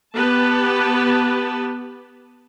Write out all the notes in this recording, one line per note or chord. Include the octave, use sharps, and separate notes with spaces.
B3 G4 B4 A5